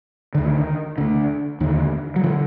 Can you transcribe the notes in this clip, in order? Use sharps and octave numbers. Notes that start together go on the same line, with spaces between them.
D2 D3 D#3
D2 D3
D#2 D3 D#3
F#3
D#3 F3
D3